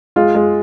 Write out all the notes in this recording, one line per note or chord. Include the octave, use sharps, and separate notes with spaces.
G#3 F4
G#3